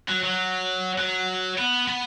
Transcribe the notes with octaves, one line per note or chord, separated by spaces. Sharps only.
F#3
F#3
F#3
B3
B3